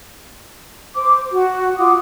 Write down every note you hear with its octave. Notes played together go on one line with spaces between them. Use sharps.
C5 D6
F#4
F4 F#5 D6 D#6